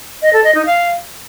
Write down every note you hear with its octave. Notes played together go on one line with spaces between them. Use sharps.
D#5
A4
D#5
D#4
F5